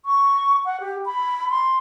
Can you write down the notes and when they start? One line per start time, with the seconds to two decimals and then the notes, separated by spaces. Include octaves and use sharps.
0.06 C#6
0.65 F#5
0.80 G4
1.06 B5
1.50 C6